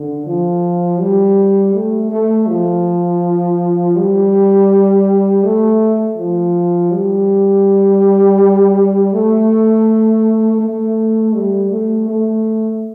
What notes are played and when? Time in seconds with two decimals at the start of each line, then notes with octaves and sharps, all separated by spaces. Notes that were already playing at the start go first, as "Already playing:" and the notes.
Already playing: D3
0.26 F3
1.00 G3
1.74 A3
2.11 A3
2.48 F3
3.96 G3
5.44 A3
6.17 F3
6.91 G3
9.13 A3
10.60 A3
11.35 G3
11.71 A3
12.08 A3